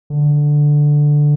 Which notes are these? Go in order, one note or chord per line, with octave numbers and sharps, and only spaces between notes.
D3